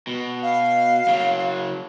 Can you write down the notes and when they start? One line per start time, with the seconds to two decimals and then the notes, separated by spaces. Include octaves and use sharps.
0.07 B2
0.43 F5
1.08 C#3 F#3